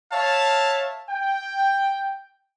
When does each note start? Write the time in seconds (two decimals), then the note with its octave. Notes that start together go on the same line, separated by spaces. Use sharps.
0.12 C#5 E5 F5 A5
1.10 G5